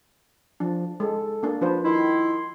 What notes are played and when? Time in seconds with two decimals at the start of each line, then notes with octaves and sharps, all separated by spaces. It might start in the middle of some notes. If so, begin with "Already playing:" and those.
0.60 F3 D4
1.00 G#3 A4
1.43 A#3 D4
1.61 F3 D4 B4 C5
1.85 D#3 E4 C6